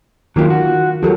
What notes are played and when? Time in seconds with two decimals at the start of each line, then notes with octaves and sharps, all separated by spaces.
0.36 D#3 F#3 A#3 F4 G4
0.50 F#4
1.03 F3 F#3 G4 A4 A#4